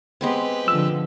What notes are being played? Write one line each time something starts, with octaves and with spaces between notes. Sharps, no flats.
G#3 B3 C4 G4 B4
D3 F3 E6